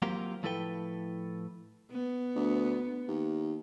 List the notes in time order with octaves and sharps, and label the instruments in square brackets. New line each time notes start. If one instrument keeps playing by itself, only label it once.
[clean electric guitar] F#3 A#3 C4 F4 G4 A#4
A2 F3 E4 A4 B4 G5
[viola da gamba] B3
[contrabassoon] D2
D#2